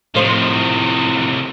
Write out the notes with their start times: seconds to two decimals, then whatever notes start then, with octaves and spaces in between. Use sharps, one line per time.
0.15 A2 C3 D#3 F3 C5